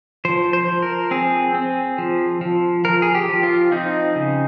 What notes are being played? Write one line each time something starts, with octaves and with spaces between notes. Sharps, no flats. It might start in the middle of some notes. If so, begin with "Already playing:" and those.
F3 C5
C5
F3
A#4
C4 G#4
C4
F3
F3
F3 A#4
G#4
G4
F3
F4
C4 D#4
C#3